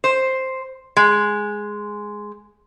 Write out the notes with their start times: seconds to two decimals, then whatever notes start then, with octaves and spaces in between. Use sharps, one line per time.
0.04 C5
0.97 G#3